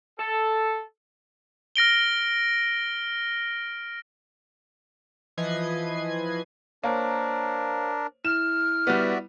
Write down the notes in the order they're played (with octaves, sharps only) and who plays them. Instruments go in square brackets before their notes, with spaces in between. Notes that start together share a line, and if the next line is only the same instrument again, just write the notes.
[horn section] A4
[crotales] F6 A#6 D7 G7
[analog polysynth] E3 F3 B4 D#5 G#6 C7
[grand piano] A#3 [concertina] D4 A#4 [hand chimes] C5 C#5
[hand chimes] E4 [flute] F6 [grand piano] E7
[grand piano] G3 B3 [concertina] F#4 D5 E5